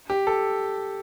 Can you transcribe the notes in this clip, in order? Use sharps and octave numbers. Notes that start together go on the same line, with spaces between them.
G4
A4